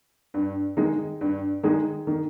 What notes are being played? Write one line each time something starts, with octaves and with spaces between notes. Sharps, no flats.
G2
D#3 G#3 D#4
G2
D#3 G#3 D#4
D#3